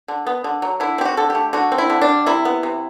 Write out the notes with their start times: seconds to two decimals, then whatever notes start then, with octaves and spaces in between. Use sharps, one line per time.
0.08 D3
0.27 B3
0.44 D3
0.62 F#3
0.80 D3 E4
0.98 C4 G4
1.05 F#4
1.17 D3 A4
1.30 A3 G4
1.53 D3 F#4
1.72 C4
1.78 E4
1.90 D3
2.02 D4
2.09 G3
2.26 C3 E4
2.45 B3
2.63 C3